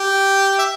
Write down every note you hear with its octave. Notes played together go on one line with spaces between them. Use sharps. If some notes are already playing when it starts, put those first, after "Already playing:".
Already playing: G4
E5